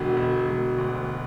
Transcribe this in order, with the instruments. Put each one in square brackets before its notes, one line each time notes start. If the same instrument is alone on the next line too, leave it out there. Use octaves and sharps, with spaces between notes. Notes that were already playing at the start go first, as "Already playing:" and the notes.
Already playing: [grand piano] E1 D3 [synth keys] F#4
[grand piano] E1
E1
D2